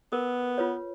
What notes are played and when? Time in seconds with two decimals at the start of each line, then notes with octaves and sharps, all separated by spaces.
0.13 B3 A#4
0.58 F4 B4 C#5